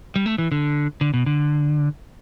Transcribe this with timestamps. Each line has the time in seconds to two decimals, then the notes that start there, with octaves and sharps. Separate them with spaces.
0.16 G3
0.26 A3
0.38 E3
0.52 D3
1.01 D3
1.14 B2
1.26 D3